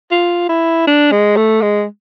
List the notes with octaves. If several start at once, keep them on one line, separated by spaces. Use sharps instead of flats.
F4
E4
D4
G#3
A3
G#3